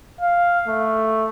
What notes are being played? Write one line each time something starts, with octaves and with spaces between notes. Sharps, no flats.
F5
A3